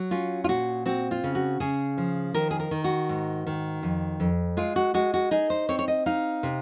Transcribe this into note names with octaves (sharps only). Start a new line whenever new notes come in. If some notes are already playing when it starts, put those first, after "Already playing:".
Already playing: F#3
C#4 F4
F4
A#2 F#4
C4 F#4
F4
C#3
F#4
C#3 G#4
F3
D#3 A#4
G#4
A#4
D#3
F#4
G#2
D#3
F2
F2
G#3 F4
F#4
G#3 F#4
F#4
D#4 G#4
C5
C4 C#5
C#5
D#5
D#4 F5
C3